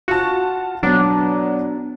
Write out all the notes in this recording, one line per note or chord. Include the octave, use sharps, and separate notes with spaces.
F4 F#4 A5
B2 F#3 B3 D4